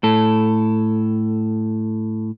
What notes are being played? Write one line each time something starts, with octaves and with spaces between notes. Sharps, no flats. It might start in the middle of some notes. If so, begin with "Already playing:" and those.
A2 A4